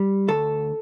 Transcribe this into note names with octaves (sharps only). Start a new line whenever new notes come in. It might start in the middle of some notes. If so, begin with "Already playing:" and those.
Already playing: G3
D2 A4